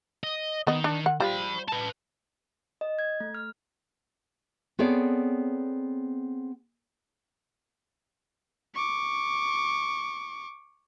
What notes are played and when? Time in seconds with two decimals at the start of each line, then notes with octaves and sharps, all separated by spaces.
0.24 D#5
0.67 D#3 B3 D#5
0.84 D4
1.06 F#5
1.20 G3 F4 C5 B5
1.68 B4 A5
2.81 D#5
2.99 G#6
3.20 A3
3.35 F6
4.79 B3 C4 G#4 A4 C#5 D5
8.75 C#6 D6